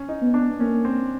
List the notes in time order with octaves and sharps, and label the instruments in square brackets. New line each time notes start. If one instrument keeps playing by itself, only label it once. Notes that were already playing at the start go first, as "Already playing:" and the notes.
Already playing: [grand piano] C#4
D#4
[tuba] B3
[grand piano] D4
[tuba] A#3 [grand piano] C#4
[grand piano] C4